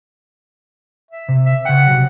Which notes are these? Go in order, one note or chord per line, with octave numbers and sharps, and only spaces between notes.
E5
C3
E5
C#3 F#5 G5
C3 F#3